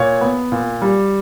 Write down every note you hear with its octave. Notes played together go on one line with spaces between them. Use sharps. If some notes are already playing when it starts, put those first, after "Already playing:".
Already playing: A#2 C#5
B3
A#2
G3